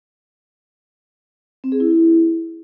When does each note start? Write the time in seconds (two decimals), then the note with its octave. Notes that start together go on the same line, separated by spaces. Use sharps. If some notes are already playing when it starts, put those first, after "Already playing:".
1.64 C4
1.72 G#4
1.80 E4